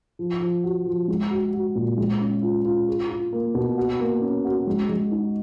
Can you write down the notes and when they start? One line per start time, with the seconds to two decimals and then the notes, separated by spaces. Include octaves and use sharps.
0.19 F3
0.41 F3
0.64 F#4
0.86 F3
1.08 G#3
1.31 F#4
1.53 F#4
1.75 A#2
1.98 G#3
2.21 C#4
2.42 F4
2.65 F4
2.88 G#4
3.09 F4
3.33 A#3
3.55 B2
3.78 F#4
4.00 A#3
4.22 C#4
4.45 F#4
4.67 G#3
4.89 G#3
5.11 D#4